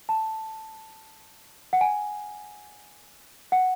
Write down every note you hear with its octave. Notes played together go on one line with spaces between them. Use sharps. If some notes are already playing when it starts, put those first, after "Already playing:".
A5
F#5
G#5
F#5